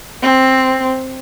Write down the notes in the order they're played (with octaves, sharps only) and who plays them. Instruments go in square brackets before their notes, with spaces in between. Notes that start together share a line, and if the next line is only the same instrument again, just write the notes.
[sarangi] C4